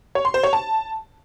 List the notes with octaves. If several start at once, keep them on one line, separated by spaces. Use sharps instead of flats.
C#5
C6
C5
C#5
A5